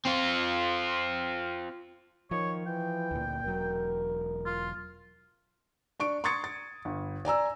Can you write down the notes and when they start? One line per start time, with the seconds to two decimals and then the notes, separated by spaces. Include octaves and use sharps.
0.05 C4 F4
2.31 D#3 F3 C#5
2.67 E3 G5
3.11 D2 A#2
3.44 E1 F#3 A#4
4.46 F4
6.00 D4 C#6 D7
6.24 C6 C#6 D#6 G#6 A6 C#7
6.44 A6
6.85 G1
7.25 D5 G#5 A#5 E6